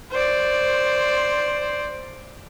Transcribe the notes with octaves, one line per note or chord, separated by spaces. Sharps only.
C5 D5